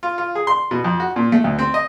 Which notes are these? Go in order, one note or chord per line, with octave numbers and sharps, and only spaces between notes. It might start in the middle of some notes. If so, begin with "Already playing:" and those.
F4
F4
G#4
C6
B2
F2
F#4
A#2
A3
D2
C4
D#5